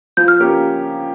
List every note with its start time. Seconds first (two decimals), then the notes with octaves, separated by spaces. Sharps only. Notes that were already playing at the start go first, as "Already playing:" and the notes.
0.17 F3 G6
0.28 F6
0.40 A#3 C#4 G4